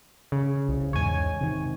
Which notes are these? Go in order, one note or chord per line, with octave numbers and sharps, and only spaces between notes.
C#3
C2
E2 G#2 C#5 G#5
C3 D#3